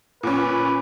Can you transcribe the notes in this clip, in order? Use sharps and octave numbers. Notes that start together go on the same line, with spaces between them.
A#2 C#4 B4